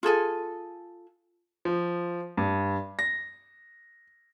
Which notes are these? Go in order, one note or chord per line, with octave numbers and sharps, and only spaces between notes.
F4 G#4 A4 G#5
F3
G2
A#6